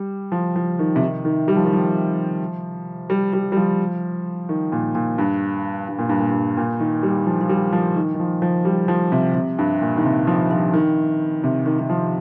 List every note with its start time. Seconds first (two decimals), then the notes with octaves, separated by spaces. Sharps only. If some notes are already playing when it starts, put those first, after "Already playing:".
Already playing: G3
0.32 F3
0.56 F3
0.79 D#3
0.96 C3
1.02 D#3
1.25 D#3
1.48 G3
1.56 F3
1.65 D#3
1.73 F3
3.10 G3
3.33 G3
3.52 G3
3.56 F3
4.49 D#3
4.72 A#2
4.95 A#2
5.18 G2
5.88 G2
5.99 A#2
6.09 G2
6.20 A#2
6.30 G2
6.57 A#2
6.80 D#3
7.03 G3
7.26 F3
7.41 F3
7.49 G3
7.73 F3
7.96 D#3
8.14 D#3
8.20 F3
8.42 F3
8.65 G3
8.88 F3
9.12 C3
9.34 C3
9.59 G2
9.82 A#2
9.97 D#3
10.04 C3
10.27 F3
10.51 F3
10.74 D#3
11.44 C3
11.66 D#3
11.79 D#3
11.89 F3